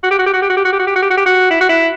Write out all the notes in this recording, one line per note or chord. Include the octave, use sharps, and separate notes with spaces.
F#4
G4
F#4
G4
F#4
G4
F#4
G4
F#4
G4
F#4
G4
F#4
G4
F#4
G4
F#4
E4
F#4
E4